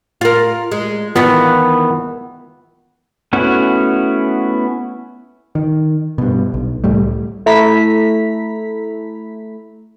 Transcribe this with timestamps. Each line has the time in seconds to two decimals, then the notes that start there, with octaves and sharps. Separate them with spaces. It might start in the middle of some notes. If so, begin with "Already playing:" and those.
0.21 F4 A#4
0.72 G#3
1.16 D#3 E3 B3 F4
3.33 A3 B3 C#4 E4 F#4
5.55 D#3
6.18 G2 B2
6.54 B1
6.84 C#2 A2 G3 A3
7.46 A3 E4 A#5 B6